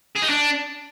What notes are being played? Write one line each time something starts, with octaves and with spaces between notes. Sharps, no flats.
G#4
D#4
D4